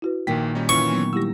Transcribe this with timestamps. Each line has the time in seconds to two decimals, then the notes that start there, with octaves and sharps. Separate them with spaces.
0.02 E4 F#4 B4
0.27 A#1 A#2 D#3 G5 B6
0.55 G3 C#4 D#4
0.69 E3 C#4 F4 C#6
0.91 F#3 B3
1.13 G3 E4 G4 E6 A#6